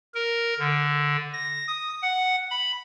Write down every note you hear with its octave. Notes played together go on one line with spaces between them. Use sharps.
A#4
D3
A#6
D#6
F#5
B5